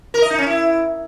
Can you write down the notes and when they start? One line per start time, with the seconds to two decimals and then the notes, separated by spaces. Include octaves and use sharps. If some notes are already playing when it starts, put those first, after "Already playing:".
0.14 A#4
0.22 D#5
0.30 D#4
0.38 C#4
0.47 E4